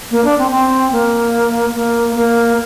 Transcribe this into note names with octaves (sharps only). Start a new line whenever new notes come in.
A#3
D4
C4
C4
A#3
A#3
A#3